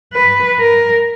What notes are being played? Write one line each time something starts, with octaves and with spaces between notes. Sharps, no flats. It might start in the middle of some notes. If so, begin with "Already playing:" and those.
B4
A#4